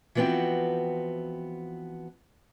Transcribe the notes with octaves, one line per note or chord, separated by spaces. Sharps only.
E3 F3 B3 C4 F#4 G5